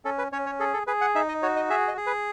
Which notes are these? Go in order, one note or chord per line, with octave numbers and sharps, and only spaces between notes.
C#4 A4
B4
C#4 C#5
C#5
G#4 A4
A4
G#4 B4
F#5
D#4 E5
D#5
F#4 C#5
D#5
G#4 E5
D#5
G#4
B4